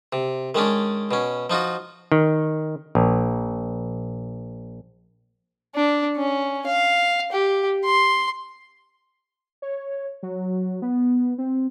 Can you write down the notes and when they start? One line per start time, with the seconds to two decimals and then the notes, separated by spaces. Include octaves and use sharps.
0.13 C3
0.55 D#3 G#3 C#4 D4
1.11 B2 C#4
1.50 F3 D#4 F4 F#4
2.12 D#3
2.95 A#1
5.75 D4
6.17 C#4
6.66 F5
7.32 G4
7.85 C6
9.62 C#5
10.23 F#3
10.82 B3
11.38 C4